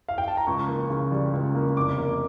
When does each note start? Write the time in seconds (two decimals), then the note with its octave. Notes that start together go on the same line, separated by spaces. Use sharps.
0.09 F5
0.18 G5
0.28 A5
0.37 A#5
0.47 C#2 C#6
0.68 A#3
0.90 C#3
1.12 G3
1.33 C#2
1.55 A#3
1.77 F1 D6
1.98 A#3